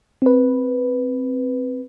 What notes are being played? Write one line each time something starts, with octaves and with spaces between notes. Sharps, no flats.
C4 B4